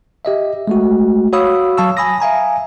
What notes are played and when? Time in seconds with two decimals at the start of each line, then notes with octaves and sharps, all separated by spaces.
0.25 G4 D#5 E5
0.68 G#3 A3 F#4
1.33 F#4 C#5 F5 B5 D#6 E6
1.77 F#3 F5 A5 C#6 E6
1.97 G#5 B5 D#6 A#6
2.20 E5 F5 G#5 A#5